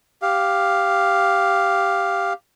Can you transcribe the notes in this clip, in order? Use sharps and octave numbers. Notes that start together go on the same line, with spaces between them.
G4 F5